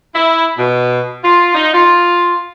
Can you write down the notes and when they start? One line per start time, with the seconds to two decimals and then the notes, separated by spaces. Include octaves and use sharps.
0.15 E4
0.57 B2
1.23 F4
1.54 D#4
1.74 F4